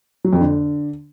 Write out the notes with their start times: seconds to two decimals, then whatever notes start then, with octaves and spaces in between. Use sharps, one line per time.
0.24 F#3
0.33 F2
0.41 D3